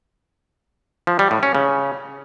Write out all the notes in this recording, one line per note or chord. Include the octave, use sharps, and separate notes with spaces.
F3
G3
A2
C#4
C#3